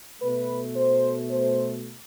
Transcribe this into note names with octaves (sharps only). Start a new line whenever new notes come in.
B2 A3 B4
C5
C5